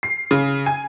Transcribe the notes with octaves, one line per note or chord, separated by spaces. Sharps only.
C7
C#3
G#5